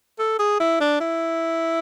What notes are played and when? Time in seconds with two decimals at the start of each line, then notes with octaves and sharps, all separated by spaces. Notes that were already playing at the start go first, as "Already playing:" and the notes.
0.19 A4
0.39 G#4
0.60 E4
0.81 D4
1.00 E4